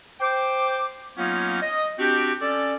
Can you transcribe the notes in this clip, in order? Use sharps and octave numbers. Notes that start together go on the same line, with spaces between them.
C5 G5 D6
F#3 A#3 B3 C#4 D#4 F4
D#5
C4 D4 F#4 G4
C#4 A4 D5